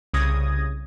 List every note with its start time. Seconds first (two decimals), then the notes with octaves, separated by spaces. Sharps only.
0.14 C2 C#3 D#6 G#6 A#6